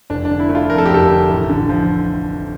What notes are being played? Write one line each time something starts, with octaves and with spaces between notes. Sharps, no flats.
F1 D4
D4
D3
E4
A3
F4
F2 A#4
A4
G4
F1 A4
D3
A1
D3
F3